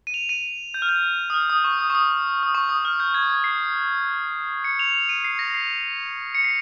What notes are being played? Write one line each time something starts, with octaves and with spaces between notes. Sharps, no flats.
D#7
F7
D#7
G6
F6
G6
D#6
F6
D#6
C#6
D#6
C#6
D#6
D#6
C#6
D#6
F6
G6
G#6
G#6
C7
C#7
F7
F7
D#7
C7
A#6
C7
C#7
C7